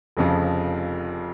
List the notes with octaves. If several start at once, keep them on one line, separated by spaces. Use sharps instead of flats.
F1 F2 C#3 F3